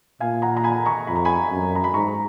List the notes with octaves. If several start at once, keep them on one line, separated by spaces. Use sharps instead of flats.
A#2 F5 G#5
F#5 A#5
A#5
G#5 B5
A#5 C#6
F2 B5
A#5
G#5 B5
F#2
A#5
B5
G#2 A#5 C#6